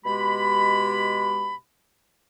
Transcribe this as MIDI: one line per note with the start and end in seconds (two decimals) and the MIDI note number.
0.05 1.55 47
0.05 1.55 56
0.05 1.55 67
0.05 1.55 83